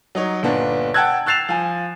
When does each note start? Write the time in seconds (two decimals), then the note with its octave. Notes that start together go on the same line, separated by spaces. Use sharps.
0.15 F#3 D#4 C#5
0.43 G1 A#2 B3 D4
0.94 F#5 G5 A5 E6 F#6 G#6
1.26 E6 F#6 A6 C7 E7 F7
1.49 F3 G#5